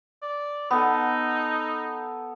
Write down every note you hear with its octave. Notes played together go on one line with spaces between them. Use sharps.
D5
B3 D#4 A4